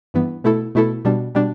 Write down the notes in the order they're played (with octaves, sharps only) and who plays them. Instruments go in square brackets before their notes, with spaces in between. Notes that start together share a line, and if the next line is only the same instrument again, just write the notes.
[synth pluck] G2 E3 B3
B2 A3 E4 A4
B2 A3 E4 A4
B2 G3 D4
B2 G3 D4